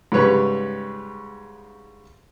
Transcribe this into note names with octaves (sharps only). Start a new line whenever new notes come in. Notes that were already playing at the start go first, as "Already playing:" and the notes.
G#2 C#3 G3 B4 C#5